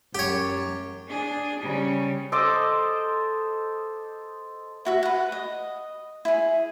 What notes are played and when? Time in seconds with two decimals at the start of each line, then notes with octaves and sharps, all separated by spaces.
0.15 F#2 G4 C#5
1.07 D4 G#4
1.59 C#3 G3
2.32 A4 C5 D#5 D6
4.85 E4 F#4 E5
5.03 B4 F#5
5.32 D#5
6.25 E4 G#4